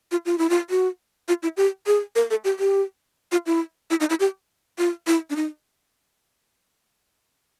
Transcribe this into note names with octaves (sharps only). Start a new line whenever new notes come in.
F4
F4
E4
F4
F#4
F4
E4
G4
G#4
A#4
A4
G4
G4
F4
E4
E4
D#4
E4
G4
F4
E4
D4
D#4